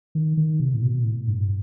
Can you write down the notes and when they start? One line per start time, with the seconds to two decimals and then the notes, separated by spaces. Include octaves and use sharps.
0.15 D#3
0.37 D#3
0.60 C3
0.74 A2
0.82 B2
1.04 A2
1.27 G2